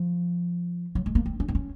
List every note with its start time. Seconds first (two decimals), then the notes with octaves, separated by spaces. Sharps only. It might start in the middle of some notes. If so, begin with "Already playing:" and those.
Already playing: F3
0.95 F#3
1.06 G#3
1.15 A#3
1.26 C4
1.40 C#4
1.48 C4
1.55 C#4